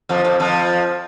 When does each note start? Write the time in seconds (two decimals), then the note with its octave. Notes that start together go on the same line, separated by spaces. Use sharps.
0.09 F2 F3
0.25 F2 F3
0.40 F2 F3